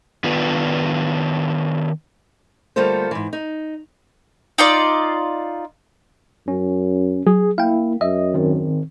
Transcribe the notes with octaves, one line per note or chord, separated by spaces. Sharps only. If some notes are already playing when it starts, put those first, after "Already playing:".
D#3 B3 D4 F4 B4
D2 G3 A#3 F4 A4 C5
G#2 E3
D#4
D#4 F4 D5
F#2 C#4
F#3 G#4
A#3 E4 F5 G5
F#2 D#5 E5
D#3 C4